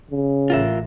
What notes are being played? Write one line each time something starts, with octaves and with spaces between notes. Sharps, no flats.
C#3
A1 A2 F4 A#4 E5